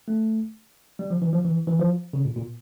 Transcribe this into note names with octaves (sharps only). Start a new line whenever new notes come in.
A3
G3
F3
E3
F3
E3
E3
F3
C#3
A#2
A#2